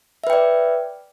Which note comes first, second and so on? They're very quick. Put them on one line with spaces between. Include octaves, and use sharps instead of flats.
E5 B4 G5 D5